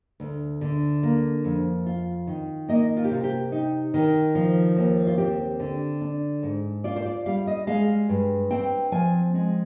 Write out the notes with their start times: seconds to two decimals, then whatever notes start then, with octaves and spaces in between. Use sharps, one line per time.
0.20 D2
0.61 D3
1.03 A#3
1.44 F2
1.86 F4
2.27 D#3
2.68 A#3 D#5
2.97 F4
3.04 G4
3.11 C3 F4
3.24 G4
3.52 D#4
3.94 D#3
4.35 F3
4.76 D#2
5.07 F4
5.18 C4 G4
5.60 D3
6.01 D4
6.43 G#2
6.84 F4 D5
6.96 C5
7.06 D5
7.26 G3 F5
7.47 D#5
7.67 G#3 F5
8.09 G2
8.51 C4 G5
8.92 F3 G#5
9.34 G#3